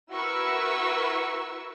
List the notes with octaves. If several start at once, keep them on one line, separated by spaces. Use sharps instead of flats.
E4 F#4 A#4 B4 C#6 E6